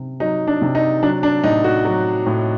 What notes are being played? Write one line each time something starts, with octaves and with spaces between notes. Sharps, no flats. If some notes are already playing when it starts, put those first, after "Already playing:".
Already playing: C3
F#3 D#4
D4
C3
D#4
F#3 D4
D4
A2 D#4
F#4
F#3
A2